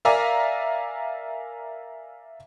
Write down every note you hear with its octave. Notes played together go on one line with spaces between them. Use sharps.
A#4 D5 E5 F5 G#5 A#5